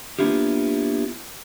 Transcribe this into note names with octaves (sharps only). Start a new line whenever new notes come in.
A#3 B3 D4 E4 F4 G4